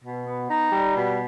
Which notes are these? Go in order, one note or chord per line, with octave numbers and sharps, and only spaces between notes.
B2
B3
D#4
G3
B2